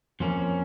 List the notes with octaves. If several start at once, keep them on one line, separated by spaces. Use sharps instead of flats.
F2 F3 A#3 C#4